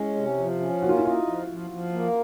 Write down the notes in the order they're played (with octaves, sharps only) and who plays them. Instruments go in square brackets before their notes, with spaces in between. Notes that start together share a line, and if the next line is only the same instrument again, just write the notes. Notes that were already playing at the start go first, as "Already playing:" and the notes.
Already playing: [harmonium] G#3 C#4 [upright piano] E4
[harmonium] C3
F3
C#4
[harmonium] A#3 [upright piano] F#4
[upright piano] F4
E4
[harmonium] D#4 [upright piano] F4
[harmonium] F3
F3
F3
A#3